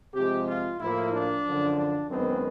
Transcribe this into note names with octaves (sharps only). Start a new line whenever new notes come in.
C3 F3 G#3 G4
F4
A2 F3 A#3 E4
D4
F#2 D3 F3
D4
F#2 D#3 G#3 B3 C4